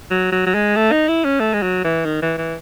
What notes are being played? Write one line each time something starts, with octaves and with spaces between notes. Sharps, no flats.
F#3
F#3
F#3
G#3
A3
D#4
E4
C#4
A3
G#3
F#3
E3
D#3
E3
E3